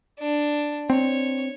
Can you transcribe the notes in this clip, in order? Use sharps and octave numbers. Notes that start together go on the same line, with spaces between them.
D4
C4 C#5